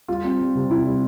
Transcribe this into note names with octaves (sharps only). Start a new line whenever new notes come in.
G3 F4
C4
G3
C3
C4 E4
G3